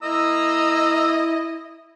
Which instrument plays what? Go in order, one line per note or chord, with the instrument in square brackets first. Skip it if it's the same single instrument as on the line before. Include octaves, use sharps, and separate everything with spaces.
[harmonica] A#3 A#5 E6 [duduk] E4 [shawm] D#5